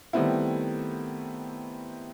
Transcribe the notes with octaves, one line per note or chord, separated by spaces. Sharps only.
D#3 G3 A3 B3 C4 E4